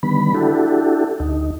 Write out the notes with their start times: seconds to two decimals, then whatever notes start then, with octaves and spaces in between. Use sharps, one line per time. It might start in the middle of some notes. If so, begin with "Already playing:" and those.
0.03 D3 D#3 G3 B3 B5
0.34 D4 E4 F#4 G4 A4
1.20 D2 D#4